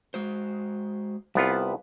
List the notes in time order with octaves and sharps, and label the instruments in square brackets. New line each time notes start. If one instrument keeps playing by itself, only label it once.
[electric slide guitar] G#3 F#4 C5
[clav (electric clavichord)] C2 B3 F4 [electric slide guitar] G3 B4